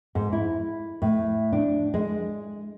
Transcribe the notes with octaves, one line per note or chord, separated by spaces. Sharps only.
G#2
E4
A2
D4
G#3